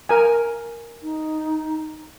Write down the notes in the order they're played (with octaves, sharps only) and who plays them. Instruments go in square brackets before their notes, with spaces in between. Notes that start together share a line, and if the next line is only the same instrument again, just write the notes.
[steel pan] A#4 G#5
[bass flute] D#4